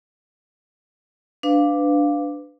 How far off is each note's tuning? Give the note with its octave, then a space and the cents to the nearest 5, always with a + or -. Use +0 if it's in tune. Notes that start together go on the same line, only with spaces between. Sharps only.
D4 +0 B4 +25 F5 +0